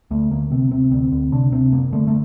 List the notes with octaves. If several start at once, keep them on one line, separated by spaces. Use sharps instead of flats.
D2 A3
D2 A#3
C3 C4
C3 C4
D2 C4
D2
C3 D4
C3 C4
F#1 A#3
D3 A3
A3